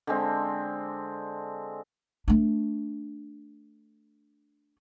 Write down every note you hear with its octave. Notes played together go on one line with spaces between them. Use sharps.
D3 G#3 C4
A3 D4